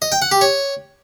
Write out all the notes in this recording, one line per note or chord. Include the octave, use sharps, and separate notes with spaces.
D#5
G5
F#5
G4
C#5